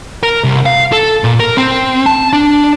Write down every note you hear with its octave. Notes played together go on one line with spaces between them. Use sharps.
A#4
C2
F5
A4
A#2
A#4
C4
A5
D4